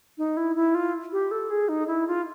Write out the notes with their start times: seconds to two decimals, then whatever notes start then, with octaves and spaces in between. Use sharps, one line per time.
0.18 D#4
0.37 E4
0.56 E4
0.75 F4
1.12 G4
1.31 A4
1.50 G#4
1.69 D#4
1.87 E4
2.08 F4